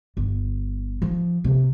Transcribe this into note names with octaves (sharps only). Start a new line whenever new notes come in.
G1
F3
C3